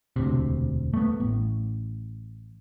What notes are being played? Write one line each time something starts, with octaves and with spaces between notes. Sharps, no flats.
E1 D2 C3
A3 B3
A1